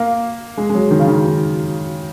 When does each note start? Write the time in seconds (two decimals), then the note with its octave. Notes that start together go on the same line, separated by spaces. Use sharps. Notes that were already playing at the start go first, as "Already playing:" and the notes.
Already playing: A#3
0.57 G#3
0.70 G#3
0.75 F#3
0.91 D#3
0.99 C#3
1.07 D#3